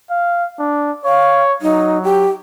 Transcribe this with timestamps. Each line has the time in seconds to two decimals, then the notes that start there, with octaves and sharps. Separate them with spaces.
0.10 F5
0.59 D4
1.05 C#5 F5
1.62 F#3 D#4
2.03 G4